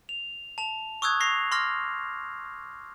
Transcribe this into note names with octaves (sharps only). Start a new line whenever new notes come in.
F7
A5 F7
C#6 D#6 E6 F#6 G#6
C#6 A#6 C7 F7
C6 D6 F6 A#6